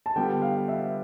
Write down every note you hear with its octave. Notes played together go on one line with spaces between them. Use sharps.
A5
D3 G3 B3 F4 G5
F5
E5